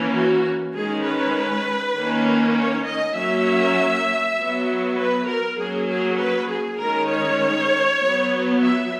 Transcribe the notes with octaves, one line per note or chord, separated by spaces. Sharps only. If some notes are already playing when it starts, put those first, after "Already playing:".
Already playing: E3 A#3 C#4
F#4
D#3 G#3 C#4 G#4
B4
D#3 A#3 C#4
C#5
D#5
F#3 A#3 C#4 E5
F#3 B3
B4
A#4
F#3 A#3 C#4 G#4
G#4
B4
G#4
D#3 G#3 C#4 A#4
C#5
F#3 B3
E5